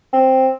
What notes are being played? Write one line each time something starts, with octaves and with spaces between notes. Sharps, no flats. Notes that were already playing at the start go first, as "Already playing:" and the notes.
C4